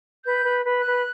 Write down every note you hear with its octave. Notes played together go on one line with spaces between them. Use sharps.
B4 G6
B4
B4
F#6
B4